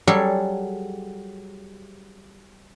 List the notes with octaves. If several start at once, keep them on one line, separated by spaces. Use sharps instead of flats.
F#3 G3 G#4 A4